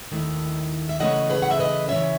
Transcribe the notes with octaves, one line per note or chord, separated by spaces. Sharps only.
D#2 D#3 A3 E4
E5
C#3 E3 A3 C#4 D#5 F#5
G#4 B4
F#5
E5
B4 D#5
C#3 E3 A3 C#4 C#5 E5